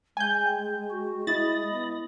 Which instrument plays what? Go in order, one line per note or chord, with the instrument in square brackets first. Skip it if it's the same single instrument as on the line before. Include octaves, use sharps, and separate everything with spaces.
[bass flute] G#3 [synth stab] G#5 G6
[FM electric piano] G5
[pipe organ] F#4
[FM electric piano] E4 [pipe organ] D#5 B5 D#6 [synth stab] A6
[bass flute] B3